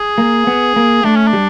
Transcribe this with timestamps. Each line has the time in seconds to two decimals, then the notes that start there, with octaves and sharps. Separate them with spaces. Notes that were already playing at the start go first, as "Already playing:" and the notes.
Already playing: G#4
0.18 A#3
0.47 B3
0.76 A#3
1.04 A3 D4
1.16 C#4
1.27 D4
1.33 G3